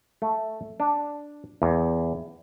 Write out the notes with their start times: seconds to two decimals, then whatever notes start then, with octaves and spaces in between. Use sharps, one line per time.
0.22 A3
0.80 D4
1.62 E2